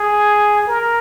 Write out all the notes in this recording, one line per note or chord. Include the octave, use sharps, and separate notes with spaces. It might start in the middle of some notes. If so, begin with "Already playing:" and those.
Already playing: G#4
A#4